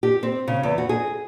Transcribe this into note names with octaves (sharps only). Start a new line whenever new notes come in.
G4
C4
C#3
E2
F#4
G#4